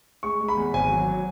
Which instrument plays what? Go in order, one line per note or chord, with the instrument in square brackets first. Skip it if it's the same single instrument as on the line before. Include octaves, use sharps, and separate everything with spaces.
[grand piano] G#3 C#6
G#3
B5
E2
G#1 G#5
F#3
F#3